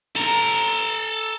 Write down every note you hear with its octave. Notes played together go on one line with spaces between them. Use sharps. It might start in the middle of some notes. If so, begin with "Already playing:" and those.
A4 A#5